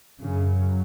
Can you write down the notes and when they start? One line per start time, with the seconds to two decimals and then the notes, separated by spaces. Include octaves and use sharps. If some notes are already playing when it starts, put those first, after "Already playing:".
0.21 F#2 C#3 F#3